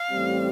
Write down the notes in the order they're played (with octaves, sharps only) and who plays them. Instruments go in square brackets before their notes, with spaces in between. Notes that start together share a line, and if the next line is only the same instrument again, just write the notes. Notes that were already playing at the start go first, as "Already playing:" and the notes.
Already playing: [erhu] F5
[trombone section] A1 A2 G3 C4